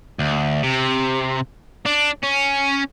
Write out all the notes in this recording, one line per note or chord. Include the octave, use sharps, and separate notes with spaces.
D2
C3
D4
C#4